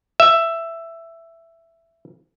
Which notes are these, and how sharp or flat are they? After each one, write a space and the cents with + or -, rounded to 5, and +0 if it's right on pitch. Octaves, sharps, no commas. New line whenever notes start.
E5 +10